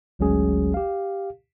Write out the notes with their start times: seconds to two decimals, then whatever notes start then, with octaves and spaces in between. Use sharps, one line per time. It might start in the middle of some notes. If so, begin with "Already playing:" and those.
0.19 G#1 D2 F#3 G#3 C#4 G#4
0.74 G4 F5